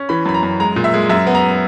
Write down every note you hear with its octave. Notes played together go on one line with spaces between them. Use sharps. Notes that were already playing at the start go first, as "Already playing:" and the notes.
Already playing: C#4
E3 B5
F#2 B5
A#5
F#2
G#3 A#5
A#2
E5
G#3
F#2 E5
B3
A#5